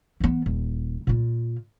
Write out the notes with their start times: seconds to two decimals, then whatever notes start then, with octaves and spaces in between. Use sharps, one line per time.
0.20 E3 B3
0.46 D#1
1.07 A#2 F4